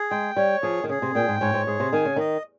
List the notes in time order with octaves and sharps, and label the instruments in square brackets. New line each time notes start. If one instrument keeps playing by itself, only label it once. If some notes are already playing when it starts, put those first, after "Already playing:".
Already playing: [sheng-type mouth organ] G#4
[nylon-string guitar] G#3 [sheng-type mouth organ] G5
[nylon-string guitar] G3 [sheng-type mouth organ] C#5
[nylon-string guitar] F3 [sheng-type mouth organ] G#4
[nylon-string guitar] D#3
[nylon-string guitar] C#3 [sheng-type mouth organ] G#4
[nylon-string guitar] C3
[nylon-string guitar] A#2 [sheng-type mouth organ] G5
[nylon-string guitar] G#2
[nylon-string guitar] G#2 [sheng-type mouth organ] C#5
[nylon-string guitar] G#2
[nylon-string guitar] G#2 [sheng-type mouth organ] G#4
[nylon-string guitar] C3
[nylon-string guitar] D#3 [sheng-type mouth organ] G#5
[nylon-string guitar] C#3
[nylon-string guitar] D#3 [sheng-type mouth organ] D#5